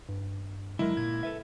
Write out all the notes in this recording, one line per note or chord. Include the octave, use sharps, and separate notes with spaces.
G2
D3 F#3 G#3 E4 A#4
A#2 G#6
A4 B4 E5